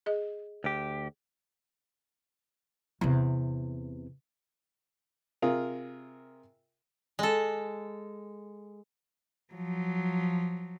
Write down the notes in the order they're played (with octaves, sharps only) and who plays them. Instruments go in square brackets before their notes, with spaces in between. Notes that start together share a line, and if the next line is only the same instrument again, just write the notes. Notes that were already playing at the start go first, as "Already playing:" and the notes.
[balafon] G#4 D#5
[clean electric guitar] D2 G4
[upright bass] E2 C3
[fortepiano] C3 F4 G#4 A#4
[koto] G#3 A4
[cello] F3 F#3